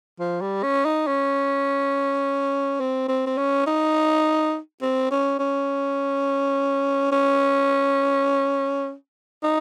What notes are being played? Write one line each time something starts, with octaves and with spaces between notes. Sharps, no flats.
F3
G3
C#4
D#4
C#4
C4
C4
C4
C#4
D#4
C4
C#4
C#4
C#4
D#4